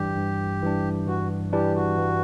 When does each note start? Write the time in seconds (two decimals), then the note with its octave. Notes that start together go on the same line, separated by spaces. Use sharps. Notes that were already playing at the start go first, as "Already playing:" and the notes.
Already playing: G2 E3 G3 D4 G4
0.17 G2
0.63 E3 G3 D4
1.08 G2 F#4
1.53 E3 G3 D4 G4
1.75 F#4
1.98 G2